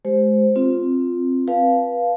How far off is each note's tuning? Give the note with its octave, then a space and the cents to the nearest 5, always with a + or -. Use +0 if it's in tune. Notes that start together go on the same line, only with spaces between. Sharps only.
G#3 +30 G4 +5 C5 +0
C4 +0 F4 +0
B4 -25 F5 +0 A5 -20